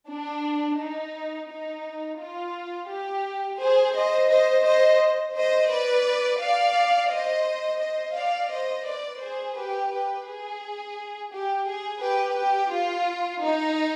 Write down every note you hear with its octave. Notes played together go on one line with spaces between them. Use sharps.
D4
D#4
D#4
F4
G4
G#4 C5
C5 D#5
C5 D#5
C5 D#5
C5 D#5
B4 D5
D5 F5
C5 D#5
C5 D#5
D5 F5
C5 D#5
B4 D5
G#4 C5
G4 B4
G4 B4
G#4
G4
G#4
G4 B4
G4
F4
D#4